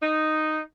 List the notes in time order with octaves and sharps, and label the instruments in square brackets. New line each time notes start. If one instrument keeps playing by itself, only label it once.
[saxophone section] D#4